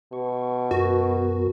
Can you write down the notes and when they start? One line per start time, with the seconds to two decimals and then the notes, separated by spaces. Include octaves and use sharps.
0.13 B2 C#6
0.71 F#2 B3 F#4 A#4